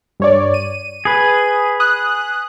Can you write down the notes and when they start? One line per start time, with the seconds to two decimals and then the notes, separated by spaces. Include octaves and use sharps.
0.20 G2 C#5 D5
0.54 D#7
1.05 G#4 B4
1.80 D#6 F#6